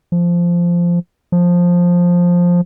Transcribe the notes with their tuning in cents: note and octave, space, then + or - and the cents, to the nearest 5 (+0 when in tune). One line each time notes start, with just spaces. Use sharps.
F3 -10
F3 +10